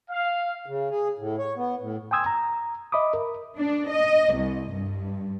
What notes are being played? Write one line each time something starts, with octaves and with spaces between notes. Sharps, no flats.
F5
C#3
G#4
A2
C#5
B3
A2
G5 G#5 C6 D#6 E6 G#6
A#5
D#5 E5 B5 D6 D#6
A#4
D4
D#5
C2
G2